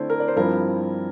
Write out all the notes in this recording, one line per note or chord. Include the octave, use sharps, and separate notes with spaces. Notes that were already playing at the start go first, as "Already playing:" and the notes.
Already playing: D3 A3 C4 E4 C5 D5
A#4
D5
C5
G2 F3 C4 E4 A#4